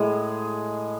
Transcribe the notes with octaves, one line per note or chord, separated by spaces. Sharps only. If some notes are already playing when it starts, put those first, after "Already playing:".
Already playing: A2 G#3 G#4